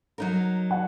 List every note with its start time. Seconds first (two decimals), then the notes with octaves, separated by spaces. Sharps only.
0.18 F#3 D#4 A#4
0.71 F#5